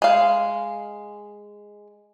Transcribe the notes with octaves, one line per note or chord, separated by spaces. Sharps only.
G#3 F5